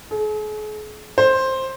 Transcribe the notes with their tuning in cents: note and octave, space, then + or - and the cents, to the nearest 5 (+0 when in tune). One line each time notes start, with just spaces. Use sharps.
G#4 +45
C5 +10